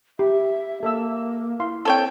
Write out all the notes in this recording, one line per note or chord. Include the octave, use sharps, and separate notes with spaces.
G4 E5
A#3 A4 E5 E6
E4 F5 C6
C4 A4 C#5 G5